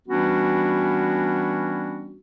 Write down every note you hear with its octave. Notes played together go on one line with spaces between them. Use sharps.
E3 G3 B3 C#4 D4 F#4